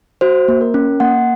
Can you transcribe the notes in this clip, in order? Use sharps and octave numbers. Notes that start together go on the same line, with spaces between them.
F#4 C5
A#3
A#4
C#4
A#3 F#5